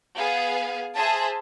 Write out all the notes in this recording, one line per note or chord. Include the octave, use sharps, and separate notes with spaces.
B3 G#4 F5
G#4 C5 E5 A5